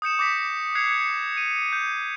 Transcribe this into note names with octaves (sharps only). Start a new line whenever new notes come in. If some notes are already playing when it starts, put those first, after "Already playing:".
D#6 G6 C#7 E7
D6 G6 A#6 B6
F#6 G#6 C7 C#7 F7
D#7
G6